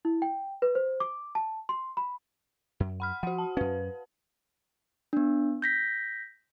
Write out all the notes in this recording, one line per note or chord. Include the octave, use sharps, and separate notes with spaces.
E4
G5
B4
C5
D6
A5
C6
B5
F#2
F#5 B5 F6
F3 F#4 F#5
A5
F#2 C#4 B4
B3 D4
G6 A#6 B6